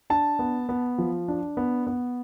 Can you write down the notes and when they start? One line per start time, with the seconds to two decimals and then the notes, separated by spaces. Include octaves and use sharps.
0.10 D4 A5
0.39 B3
0.69 B3
0.98 F3
1.28 D4
1.57 B3
1.87 B3